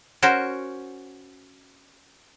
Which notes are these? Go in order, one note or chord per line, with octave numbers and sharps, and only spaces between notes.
C#4 F#4 A#4 C5